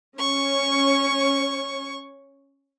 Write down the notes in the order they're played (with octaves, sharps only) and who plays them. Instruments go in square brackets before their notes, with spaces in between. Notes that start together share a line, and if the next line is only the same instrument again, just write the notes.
[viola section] C#4 C#5 [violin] C#6